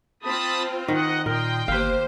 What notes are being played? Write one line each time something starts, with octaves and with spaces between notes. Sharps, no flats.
C4 F4 A5 B5 D#6
D#3 D#5 F#5
A#2 A#4 D#5 G5 C6
G1 A#3 G4 B4 C5 F5